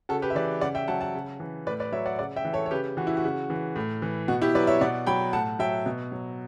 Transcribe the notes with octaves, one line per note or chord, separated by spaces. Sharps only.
C#3 F#4 A4
G4 B4
E5
E3 B4 D5
C#3 D5 F#5
E5 G5
F#3 F#5 A5
F#5 A5
C#3
E3
A2 B4 D5
B4 D5
F#3 C#5 E5
D5 F#5
C#3 D5 F#5
E5 G5
E3
A4 C#5
C#5
C#3 G4 B4
E3 F#4
E4
F#4
C#3
E3
A2
E3
B2 F#4
E4 G4
F#3 B4 D5
C#5 E5
B2 D5 F#5
F#3 G5 B5
A2 F#5 A5
F#3 E5 G5
B2
F#3